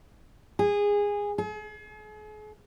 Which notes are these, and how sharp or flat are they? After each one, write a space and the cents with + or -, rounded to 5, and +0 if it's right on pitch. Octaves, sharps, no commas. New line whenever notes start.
G#4 -20
G#4 +40